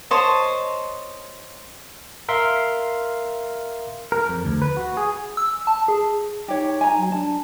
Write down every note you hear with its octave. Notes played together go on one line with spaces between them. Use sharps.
C5 C#5 D#5 A5
A#4 E5 F5 C6
A#4
F2
D2
B4
F#4
G#4
E6
A5
G#4
D#4 G4 C#5
G#5 A#5
F#3
D4 A5